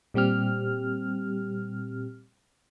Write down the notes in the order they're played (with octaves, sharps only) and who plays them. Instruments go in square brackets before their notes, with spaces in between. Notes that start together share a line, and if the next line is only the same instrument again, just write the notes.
[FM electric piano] A#2 G3 C4 G4 F6